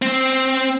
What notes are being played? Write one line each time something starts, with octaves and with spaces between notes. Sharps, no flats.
C4